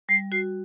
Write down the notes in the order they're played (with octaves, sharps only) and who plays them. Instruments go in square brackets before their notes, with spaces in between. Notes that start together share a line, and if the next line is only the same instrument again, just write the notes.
[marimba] G3 [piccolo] C7
[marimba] F#4 [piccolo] C7